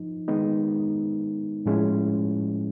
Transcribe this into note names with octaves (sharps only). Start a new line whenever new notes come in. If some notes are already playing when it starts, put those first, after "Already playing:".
Already playing: F3 D#4
D#3 G#3 B3 D#4
A2 F3 G#3 C#4 E4